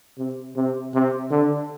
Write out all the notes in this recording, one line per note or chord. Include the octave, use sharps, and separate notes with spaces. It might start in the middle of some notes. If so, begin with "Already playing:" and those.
C3
C3
C3
D3